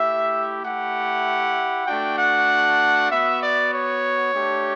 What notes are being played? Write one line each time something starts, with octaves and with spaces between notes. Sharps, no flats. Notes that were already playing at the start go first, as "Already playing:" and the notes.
Already playing: A3 E4 G4 E5
A3 E4 G4 F#5
A3 D4 F#4 G5
F#5
B3 F#4 E5
D5
C#5
A3 D4 G4